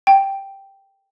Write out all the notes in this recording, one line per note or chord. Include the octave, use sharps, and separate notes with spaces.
G5